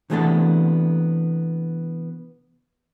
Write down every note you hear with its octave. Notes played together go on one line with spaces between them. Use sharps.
C3 E3 A3 B3 D4 A5